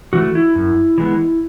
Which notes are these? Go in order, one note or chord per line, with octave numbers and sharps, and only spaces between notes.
E3 A3 F#4
E4
F#2
E3 G#3 B3